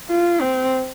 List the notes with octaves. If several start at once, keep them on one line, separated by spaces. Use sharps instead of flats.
F4
C4